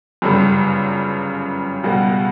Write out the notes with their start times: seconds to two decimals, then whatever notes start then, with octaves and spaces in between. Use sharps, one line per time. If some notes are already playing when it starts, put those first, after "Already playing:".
0.22 G1 F#2 C#3 G3
1.83 C#2 B2 G3 B3